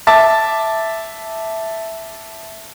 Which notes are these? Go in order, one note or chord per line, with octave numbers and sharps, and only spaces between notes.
E5 A5 D6 A6